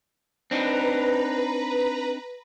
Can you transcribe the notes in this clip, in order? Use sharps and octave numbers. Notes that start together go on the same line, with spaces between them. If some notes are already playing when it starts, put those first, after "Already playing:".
C4 D4 D#4 B4 A#5